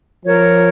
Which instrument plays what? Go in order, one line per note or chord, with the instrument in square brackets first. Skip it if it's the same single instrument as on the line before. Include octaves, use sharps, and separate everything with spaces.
[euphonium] F3 [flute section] A#4 C#5